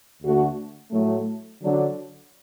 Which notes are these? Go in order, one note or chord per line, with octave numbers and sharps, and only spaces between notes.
D2 D3 A3 F#4
A2 F#3 A3
D3 F#3 D4